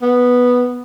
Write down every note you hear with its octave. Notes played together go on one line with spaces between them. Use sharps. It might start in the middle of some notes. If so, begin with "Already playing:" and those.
B3